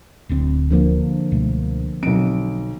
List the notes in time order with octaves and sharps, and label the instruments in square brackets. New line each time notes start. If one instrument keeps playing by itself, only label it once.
[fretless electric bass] D1 D2 C4
[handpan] D3 F3 A#3
[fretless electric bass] C#2 B2 A3
[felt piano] B1 D7 [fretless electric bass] F#3 C4